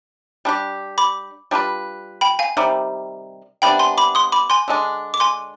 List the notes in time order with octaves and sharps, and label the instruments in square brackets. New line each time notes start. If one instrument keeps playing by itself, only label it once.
[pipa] G3 D4 G4
[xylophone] B5 D6
[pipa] G3 D4 F4 B4
[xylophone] G5 B5
F5 G#5
[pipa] C3 D#3 G3
[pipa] C3 G3 B3 D4 [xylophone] G5 B5
[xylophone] G#5 C6
B5 D6
C6 D#6
B5 D6
G#5 C6
[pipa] D3 G#3 D4
[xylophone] D6
G#5 C6